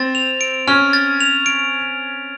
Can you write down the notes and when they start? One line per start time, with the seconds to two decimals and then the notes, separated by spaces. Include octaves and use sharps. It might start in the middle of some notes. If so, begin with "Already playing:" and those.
Already playing: C4 A6
0.15 F7
0.41 D7
0.67 C#4 F6
0.93 A6
1.20 F7
1.46 D7